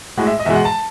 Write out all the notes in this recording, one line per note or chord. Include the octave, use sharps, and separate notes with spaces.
A2 G#3 F#4
E5
D#5
E2 B2 G#3 E5
F#5
A5